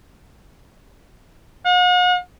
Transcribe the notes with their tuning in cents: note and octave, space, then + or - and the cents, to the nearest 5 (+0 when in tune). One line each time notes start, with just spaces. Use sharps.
F#5 -45